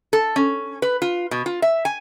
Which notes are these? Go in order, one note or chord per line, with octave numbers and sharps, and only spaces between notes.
A4
C#4
B4
F4
B2
F4
E5
G#5